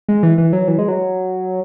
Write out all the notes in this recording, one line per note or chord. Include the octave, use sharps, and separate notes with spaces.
G#3
E3
E3
F#3
E3
G#3
F#3